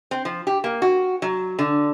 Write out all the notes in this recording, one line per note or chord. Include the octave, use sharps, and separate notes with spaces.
C4
F3
G4
A#3
F#4
F#3
D3